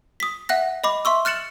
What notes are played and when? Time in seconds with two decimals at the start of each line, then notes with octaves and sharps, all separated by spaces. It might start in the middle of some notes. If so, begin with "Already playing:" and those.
0.20 D#6 B6
0.49 E5 F#5 F#6 A#6
0.84 D#5 B5 D6
1.05 E5 C6 C#6 E6
1.25 F6 F#6 A6 C#7 E7 F#7